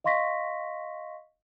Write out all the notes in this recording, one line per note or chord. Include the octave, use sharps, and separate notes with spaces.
D#5 F5 C6 C#6 A#6 B6